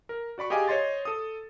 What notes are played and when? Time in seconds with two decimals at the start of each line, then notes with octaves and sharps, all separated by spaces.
0.09 A#4
0.38 F#4 D5 B5 C#6
0.50 G4 G#4 D#5 F5 G#5 D6
0.68 C5 C#5 D#5 C6 A6
1.05 A4 D#6